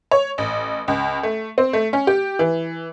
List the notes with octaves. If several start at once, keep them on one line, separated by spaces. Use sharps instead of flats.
C#5
A1
C#2
A3
C4
A3
C#4
G4
E3